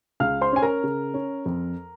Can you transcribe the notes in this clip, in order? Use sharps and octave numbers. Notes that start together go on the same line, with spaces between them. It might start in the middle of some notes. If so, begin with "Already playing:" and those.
C#2 F5 F6
C5 C6
C#4 G#5
A#4 A#5
C#3
C#4
F2